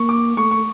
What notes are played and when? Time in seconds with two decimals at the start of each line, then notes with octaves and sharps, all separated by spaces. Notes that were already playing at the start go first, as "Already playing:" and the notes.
Already playing: A#3 C#6
0.09 D6
0.37 A3 C#6
0.51 C#6